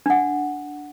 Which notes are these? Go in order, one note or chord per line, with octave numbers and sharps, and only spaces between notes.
D4 F#5